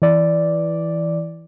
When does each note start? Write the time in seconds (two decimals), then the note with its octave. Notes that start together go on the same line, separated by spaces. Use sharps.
0.02 E3 D5